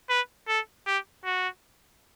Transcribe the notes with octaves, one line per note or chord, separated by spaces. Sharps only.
B4
A4
G4
F#4